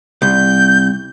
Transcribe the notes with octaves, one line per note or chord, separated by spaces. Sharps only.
C2 G6